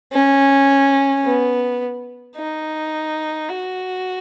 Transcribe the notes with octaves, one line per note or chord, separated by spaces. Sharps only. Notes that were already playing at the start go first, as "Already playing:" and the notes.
C#4
B3
D#4
F#4